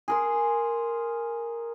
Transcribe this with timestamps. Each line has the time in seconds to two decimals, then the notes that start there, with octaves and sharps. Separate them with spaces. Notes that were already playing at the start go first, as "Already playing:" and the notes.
0.08 G#4 A#4 C6